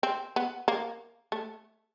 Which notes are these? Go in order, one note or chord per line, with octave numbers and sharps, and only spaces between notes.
C4
B3
A#3
A3